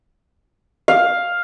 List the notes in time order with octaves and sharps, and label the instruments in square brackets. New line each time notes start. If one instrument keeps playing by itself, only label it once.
[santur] F5